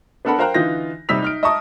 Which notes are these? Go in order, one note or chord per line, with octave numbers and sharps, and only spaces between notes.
B3 D4 A4 A#4 F#5 B5
A#4 C5 F5 G5 A#5 F#6
D3 E3 D#4 F4 G6 A#6
C3 G3 D#4 E6 B6 F7
D#4 F6 D7
D#5 E5 A5 A#5 C#6 D#6